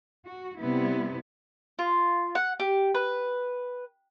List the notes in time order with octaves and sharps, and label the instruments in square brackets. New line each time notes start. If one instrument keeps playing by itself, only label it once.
[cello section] F#4
C3 G3 B3 E4
[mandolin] F4
F#5
G4
B4